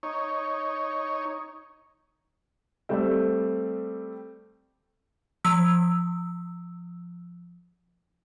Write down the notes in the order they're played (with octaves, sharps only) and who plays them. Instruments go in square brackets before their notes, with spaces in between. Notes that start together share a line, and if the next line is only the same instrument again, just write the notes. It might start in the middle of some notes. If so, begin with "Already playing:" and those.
[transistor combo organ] D#4 C#5
[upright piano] G3 A3 C4
[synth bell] F3 E6